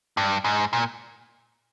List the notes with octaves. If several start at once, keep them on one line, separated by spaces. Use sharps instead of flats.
G2
G#2
A#2